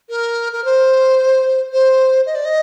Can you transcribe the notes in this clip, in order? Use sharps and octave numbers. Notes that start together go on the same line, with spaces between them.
A#4
A#4
C5
C5
D#5
D5
D#5